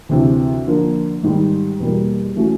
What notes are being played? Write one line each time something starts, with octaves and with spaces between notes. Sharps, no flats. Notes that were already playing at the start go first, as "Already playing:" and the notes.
D2 C3 E3
D3 F3 A#3 D4
G#2 D#3 G3
E2 B2 G3 A#3
E3 A3 C#4 F#4